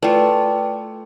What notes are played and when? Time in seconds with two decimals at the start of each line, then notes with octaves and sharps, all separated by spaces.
0.03 A3 F4 B4 D5 G5